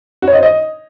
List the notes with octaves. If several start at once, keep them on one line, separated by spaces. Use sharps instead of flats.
F#4
C#5
D#5
C5
D#5